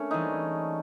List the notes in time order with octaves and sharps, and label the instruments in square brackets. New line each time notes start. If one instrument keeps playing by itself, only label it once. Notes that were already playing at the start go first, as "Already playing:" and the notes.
Already playing: [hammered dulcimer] A3 C#4 [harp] A#3 D4
[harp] E3 G3 C4 E4 G#4 [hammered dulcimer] D#4